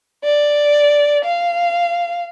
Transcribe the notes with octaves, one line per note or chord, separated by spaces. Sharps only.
D5
F5